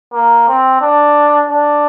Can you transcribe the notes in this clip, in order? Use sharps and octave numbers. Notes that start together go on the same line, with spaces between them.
A#3
C4
D4
D4